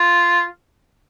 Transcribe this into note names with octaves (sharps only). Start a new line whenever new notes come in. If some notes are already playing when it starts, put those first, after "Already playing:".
Already playing: F4